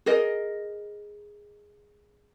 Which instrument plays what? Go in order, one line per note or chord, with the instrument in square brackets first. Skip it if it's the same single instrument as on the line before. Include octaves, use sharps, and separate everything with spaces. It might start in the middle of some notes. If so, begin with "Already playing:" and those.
[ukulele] G#4 A#4 D#5